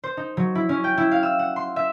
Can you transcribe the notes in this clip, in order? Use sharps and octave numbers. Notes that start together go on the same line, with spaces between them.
C5
D#4
F#3
E4
C#4
G5
E4
F5
E6
F#5
C6
E5